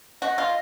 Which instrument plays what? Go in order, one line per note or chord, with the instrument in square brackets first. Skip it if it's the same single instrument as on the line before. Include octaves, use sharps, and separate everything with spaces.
[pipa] F#4 [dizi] D#5
[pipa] F4